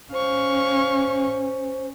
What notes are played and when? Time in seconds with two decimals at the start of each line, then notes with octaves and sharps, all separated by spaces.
0.13 C#4 C5 F5 C#6